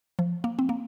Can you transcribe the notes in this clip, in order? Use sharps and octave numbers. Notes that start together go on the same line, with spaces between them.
F3
A#3
C4
A#3